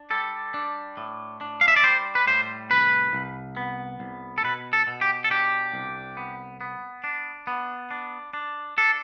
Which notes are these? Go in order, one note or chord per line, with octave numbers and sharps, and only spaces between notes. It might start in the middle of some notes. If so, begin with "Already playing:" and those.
Already playing: D4
G3 A4
D4
A2
D4
F5
E5
D5
G3 C5
B4
A2 C5
C2 B4
C2
B3
C2
A4
B2 B4
A4
B2
G4
A4
D4 G4
C2
B3
B3
D4
B3
D4
D4
D4 A4